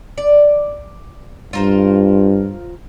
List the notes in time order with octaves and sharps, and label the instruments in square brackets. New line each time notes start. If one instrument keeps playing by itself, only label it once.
[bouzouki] D5
[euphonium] G2 [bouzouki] F4 A#4 C5